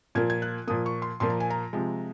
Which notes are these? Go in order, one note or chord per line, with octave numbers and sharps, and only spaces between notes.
A#2 F3 A#3 G#6
G#6
F#6
A#2 F3 A#3 D#6
C#6
C6
A#2 F3 A#3 C6
A#5
G#5
A#5
C3 F3 G#3